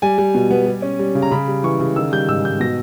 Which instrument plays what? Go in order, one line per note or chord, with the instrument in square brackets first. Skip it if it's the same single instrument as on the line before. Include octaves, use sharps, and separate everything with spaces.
[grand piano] G3 G#5
G3
B2
B3
G3
C#4
G3
C#3
A#5
C#3 B5
G3
E3 C#6
C#3
D#3 E6
G3 G6
G#2 E6
G#2 G6
B2 A#6